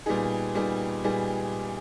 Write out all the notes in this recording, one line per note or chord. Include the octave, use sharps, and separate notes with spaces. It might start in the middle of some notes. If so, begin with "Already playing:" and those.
A#2 G3 B3 D#4 G#4
A#2 G3 B3 D#4 G#4
A#2 G3 B3 D#4 G#4